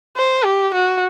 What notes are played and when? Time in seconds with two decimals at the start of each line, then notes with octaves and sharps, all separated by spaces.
0.17 C5
0.45 G4
0.74 F#4